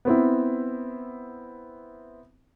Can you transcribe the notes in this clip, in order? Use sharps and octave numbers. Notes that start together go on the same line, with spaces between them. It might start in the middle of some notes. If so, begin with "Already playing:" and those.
B3 C4 E4